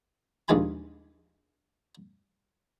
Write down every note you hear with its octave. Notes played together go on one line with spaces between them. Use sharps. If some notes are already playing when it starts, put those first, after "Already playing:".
A#1 D#2 G#3 F4 G#5 B5